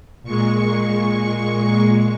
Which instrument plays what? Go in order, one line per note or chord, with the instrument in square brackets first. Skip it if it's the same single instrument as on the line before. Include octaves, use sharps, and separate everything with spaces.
[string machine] A#2 G#3 C#6